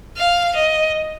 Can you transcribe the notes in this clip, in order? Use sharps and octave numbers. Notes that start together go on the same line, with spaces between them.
F5
D#5